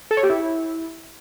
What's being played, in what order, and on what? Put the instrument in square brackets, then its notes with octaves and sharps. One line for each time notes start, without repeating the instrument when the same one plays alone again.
[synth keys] A4
C#5
G4
E4